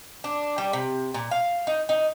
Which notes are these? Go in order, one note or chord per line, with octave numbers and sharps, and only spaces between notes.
D4
G3
C3
A#2
F5
D#4
D#4